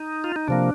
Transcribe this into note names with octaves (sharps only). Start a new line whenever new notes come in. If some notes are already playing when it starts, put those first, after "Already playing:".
Already playing: D#4
F4
D#4
C3 F3 A#3 D4